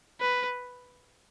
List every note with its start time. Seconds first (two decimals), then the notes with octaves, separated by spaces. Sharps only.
0.20 B4